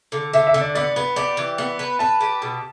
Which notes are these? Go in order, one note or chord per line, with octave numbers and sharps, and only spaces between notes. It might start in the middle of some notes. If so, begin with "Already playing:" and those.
D3
D3 E5
E5
D3
D5
B3 D5
B3 B4
G4 D5
E3
B3
B4
B4 A5
G4
B2